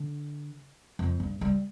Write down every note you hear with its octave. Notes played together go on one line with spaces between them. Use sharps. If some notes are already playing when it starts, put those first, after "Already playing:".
Already playing: D3
F2
G2
G3